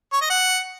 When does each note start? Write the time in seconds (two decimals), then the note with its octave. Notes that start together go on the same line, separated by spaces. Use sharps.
0.13 C#5
0.21 D#5
0.30 F#5